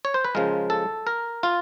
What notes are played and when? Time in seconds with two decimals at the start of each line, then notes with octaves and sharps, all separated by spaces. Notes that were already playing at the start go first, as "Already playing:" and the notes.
0.05 C#5
0.14 C5
0.25 B4
0.35 C#3 F3 G#3 A#4
0.70 A4
1.07 A#4
1.43 F4